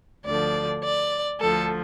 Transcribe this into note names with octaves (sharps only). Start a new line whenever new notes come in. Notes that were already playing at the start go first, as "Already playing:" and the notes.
D2 D3 F3 D5
D5
D2 D3 F3 A4